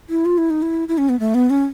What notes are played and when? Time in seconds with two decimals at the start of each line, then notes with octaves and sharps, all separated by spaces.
0.09 E4
0.25 F4
0.38 E4
0.50 D#4
0.62 E4
0.88 E4
0.98 C#4
1.09 B3
1.20 A3
1.34 B3
1.50 C#4